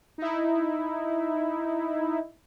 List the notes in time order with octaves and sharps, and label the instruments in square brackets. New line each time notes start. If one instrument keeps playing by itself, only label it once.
[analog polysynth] D#4 E4